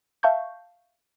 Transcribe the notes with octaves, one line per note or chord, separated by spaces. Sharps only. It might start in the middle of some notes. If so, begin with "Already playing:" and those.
E5 F5 A5 C#6 G6